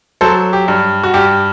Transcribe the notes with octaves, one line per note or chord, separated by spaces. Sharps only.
F#3 A4 C5
G4
G2
F#4
G2 G4